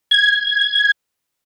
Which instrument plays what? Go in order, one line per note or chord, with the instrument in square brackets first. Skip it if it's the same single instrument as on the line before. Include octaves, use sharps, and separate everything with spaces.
[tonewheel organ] G#6